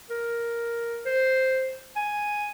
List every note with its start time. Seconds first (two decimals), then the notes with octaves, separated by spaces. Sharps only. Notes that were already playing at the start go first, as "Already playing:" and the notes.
0.10 A#4
1.06 C5
1.96 G#5